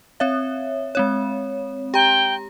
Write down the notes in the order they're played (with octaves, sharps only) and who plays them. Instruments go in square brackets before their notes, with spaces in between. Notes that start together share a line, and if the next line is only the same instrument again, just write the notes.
[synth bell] C4 C#5 E5
G#3 C4 C#5
[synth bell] G4 A#5 [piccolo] G5